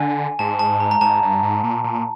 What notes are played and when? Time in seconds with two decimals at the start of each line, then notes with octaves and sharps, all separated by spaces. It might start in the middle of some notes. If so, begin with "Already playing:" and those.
Already playing: D3 G#5
0.39 G#2 A5
0.59 A5
0.80 A#5
0.91 A#5
1.01 G#2 A5
1.22 G2
1.43 G#2
1.64 A#2
1.84 A#2